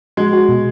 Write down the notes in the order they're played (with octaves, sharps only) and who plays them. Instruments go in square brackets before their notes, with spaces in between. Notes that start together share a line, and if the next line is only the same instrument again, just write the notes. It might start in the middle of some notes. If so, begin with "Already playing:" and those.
[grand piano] G#3 [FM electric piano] F#4
[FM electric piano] F#4
B2